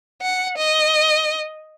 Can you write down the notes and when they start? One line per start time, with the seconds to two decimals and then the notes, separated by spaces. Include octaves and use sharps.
0.22 F#5
0.58 D#5